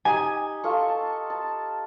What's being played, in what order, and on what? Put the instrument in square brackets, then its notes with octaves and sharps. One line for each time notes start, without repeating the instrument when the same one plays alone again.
[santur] D#4 G4 [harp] G#5
[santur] F4 A4 C#6
A5
A5